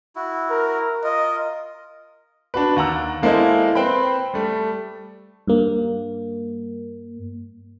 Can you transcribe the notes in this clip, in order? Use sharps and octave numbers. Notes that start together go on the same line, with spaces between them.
E4 F#4
A#4
F4 A#4 D#5
D4 F#4 B4
D#2 F#5 A#5 E6
G#3 A#3 E4 A4 C5 D#5
C4 B4 C5 G5 B5
G3 A3
G2 A#3